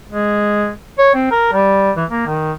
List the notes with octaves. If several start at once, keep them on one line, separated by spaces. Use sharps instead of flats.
G#3
C#5
C4
A#4
G3
E3
A#3
D#3